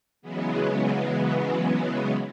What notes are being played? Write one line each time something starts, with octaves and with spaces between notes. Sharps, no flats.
C#3 E3 F#3 G#3 B3